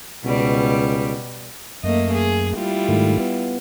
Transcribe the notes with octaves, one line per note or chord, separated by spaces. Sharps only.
C#2 B2 G3
F#2 A3 A#3 D#5
G#4
G3 E4 F4
G#2 D#3 A3
B3